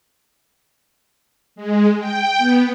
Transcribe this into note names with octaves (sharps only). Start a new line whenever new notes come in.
G#3
G5
B3